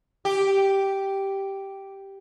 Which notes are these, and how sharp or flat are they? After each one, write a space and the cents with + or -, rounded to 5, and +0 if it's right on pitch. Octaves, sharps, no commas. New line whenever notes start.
G4 -5